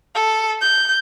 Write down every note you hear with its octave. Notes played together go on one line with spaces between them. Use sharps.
A4
G6